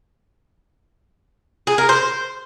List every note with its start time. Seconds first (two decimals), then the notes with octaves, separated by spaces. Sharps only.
1.67 G#4
1.78 A#4
1.89 C5